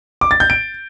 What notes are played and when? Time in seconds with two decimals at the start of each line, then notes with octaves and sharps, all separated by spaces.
0.21 D6
0.31 A6
0.40 G6
0.50 D7